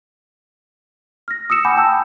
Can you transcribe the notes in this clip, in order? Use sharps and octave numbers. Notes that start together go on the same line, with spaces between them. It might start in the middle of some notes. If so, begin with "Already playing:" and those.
F6 A#6
D#6 E6 C#7 E7
F#5 G#5 B5 D6 G6
G5 A5 E6 G6